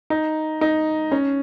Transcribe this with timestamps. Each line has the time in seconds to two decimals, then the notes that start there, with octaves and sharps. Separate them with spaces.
0.10 D#4
0.61 D#4
1.12 C#4